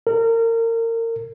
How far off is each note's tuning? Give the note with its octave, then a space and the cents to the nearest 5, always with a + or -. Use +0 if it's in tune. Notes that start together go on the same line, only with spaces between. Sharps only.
A#4 -30